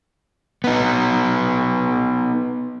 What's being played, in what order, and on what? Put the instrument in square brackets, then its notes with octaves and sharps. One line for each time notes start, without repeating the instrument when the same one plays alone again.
[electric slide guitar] B3 D#4